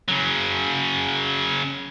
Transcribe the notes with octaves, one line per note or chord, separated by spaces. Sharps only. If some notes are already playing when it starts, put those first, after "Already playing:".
C#3 F#3